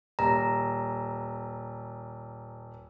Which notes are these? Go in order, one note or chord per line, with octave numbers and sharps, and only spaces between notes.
D#1 A#5